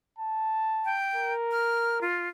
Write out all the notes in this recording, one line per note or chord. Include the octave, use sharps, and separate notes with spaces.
A5
G5
A#4
F6
F4